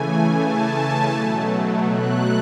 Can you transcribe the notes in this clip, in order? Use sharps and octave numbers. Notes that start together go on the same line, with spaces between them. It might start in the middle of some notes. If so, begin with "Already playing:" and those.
Already playing: C#3 E3 A3 G#5
A5
B2 F#3 A3
F#6